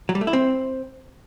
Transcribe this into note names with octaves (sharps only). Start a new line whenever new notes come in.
F#3
G3
A3
E4
C4